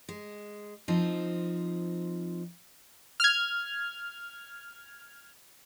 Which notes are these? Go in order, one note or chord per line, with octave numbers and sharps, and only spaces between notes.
G#3
F3 C4 D#4
F6 G#6